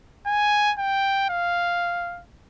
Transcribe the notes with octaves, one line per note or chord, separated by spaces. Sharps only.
G#5
G5
F5